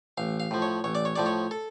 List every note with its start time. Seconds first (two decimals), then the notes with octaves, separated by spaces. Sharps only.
0.17 A1 F5
0.40 F5
0.51 A2 F3
0.62 C#5
0.84 A1 C#5
0.95 D5
1.05 C#5
1.16 A2 F3 D5
1.26 C#5
1.51 A4